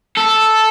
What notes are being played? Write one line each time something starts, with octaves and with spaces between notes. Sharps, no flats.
A4